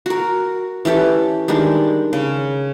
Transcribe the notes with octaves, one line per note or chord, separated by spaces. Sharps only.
F#4 A#4
E3 C#4 G4 A4
D#3 G3 G#3 D4
C#3